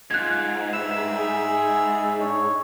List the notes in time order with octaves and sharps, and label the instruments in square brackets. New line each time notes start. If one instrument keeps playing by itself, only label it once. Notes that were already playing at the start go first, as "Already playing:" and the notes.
[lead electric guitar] G#2 [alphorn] F4 [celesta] F#6 G#6
[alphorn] G2 [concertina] E5 B5 E6 [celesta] E7
[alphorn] G#4
[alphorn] D4 [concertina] C#5